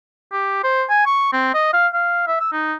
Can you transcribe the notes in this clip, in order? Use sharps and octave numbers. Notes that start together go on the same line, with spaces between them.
G4
C5
G#5
C#6
C4
D#5
F5
F5
E5
E6
D#4